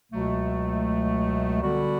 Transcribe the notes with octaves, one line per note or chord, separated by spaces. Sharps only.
C#2 B2 F#3 A3
D3 G3 B3 F#4